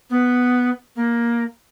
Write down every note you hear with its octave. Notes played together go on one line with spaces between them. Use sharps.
B3
A#3